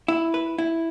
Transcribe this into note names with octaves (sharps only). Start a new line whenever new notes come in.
E4
B4
E4